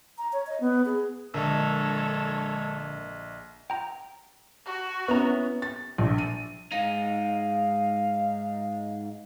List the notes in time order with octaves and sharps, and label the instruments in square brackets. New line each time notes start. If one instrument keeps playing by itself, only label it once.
[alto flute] A#5
C#5
D#5
B3
G#4
[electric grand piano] A#1 D#5 [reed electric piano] D3 A#4 E6 [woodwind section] G#3 [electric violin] A4 C#5
[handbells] G5 A#5
[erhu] F#4
[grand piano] B3 C#4 E4 [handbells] B4 A#5
[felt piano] A6
A#1
D#7
[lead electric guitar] G#2 D#4 [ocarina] F5